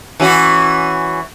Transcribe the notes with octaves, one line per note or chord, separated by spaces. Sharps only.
E3 C#4 F#4